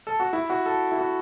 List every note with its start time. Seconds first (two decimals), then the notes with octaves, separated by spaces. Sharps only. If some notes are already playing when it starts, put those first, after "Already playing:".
0.07 A4
0.20 F#4
0.33 E4
0.50 F#4
0.66 A4
0.92 E4
0.99 F#4